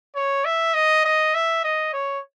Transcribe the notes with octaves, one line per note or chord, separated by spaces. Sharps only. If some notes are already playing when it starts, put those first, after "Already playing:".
C#5
E5
D#5
D#5
E5
D#5
C#5